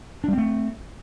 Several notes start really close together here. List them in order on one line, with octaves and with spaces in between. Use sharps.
D4 G3 C4 A3